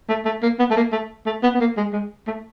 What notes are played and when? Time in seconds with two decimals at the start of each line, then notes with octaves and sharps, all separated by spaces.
0.09 A3
0.25 A3
0.43 A#3
0.59 B3
0.71 A3
0.77 A#3
0.92 A3
1.26 A3
1.43 B3
1.54 B3
1.61 A#3
1.77 G#3
1.93 G#3
2.28 A3